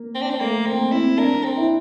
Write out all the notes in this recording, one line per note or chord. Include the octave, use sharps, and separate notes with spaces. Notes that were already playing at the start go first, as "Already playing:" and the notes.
Already playing: A#3
C4
D4
C4
A3 A#3
A#3 C4
C4 E4
D4 A#4
C4
E4